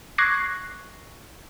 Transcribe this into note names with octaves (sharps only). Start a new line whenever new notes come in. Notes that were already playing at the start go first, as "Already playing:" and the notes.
C#6 D6 F#6 G#6 A#6 C7